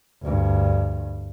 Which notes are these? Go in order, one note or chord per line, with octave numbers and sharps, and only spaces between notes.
D2 G2